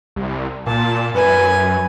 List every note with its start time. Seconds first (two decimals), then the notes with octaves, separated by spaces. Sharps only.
0.16 C2
0.66 A#2 A5
1.14 F#2 B4 G#5